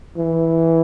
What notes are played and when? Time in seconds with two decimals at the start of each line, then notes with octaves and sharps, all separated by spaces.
0.17 E3